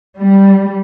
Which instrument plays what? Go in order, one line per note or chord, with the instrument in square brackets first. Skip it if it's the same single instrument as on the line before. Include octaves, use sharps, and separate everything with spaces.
[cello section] G3